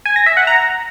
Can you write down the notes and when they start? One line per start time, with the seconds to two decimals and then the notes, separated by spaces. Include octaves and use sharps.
0.05 G#5
0.16 A#6
0.26 E5
0.37 F#5
0.47 A#5